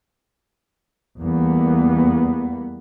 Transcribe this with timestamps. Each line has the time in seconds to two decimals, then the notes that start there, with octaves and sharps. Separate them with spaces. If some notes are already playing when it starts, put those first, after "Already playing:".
1.19 E2 G3 A#3 B3